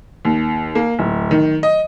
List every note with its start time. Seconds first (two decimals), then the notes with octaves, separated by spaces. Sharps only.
0.25 D#2
0.75 A#3
0.99 D1
1.31 D#3
1.63 D#5